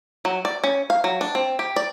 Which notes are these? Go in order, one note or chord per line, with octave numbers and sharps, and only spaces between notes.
F#3
D5
C#4
F5
F#3
D4
C4
G4
D5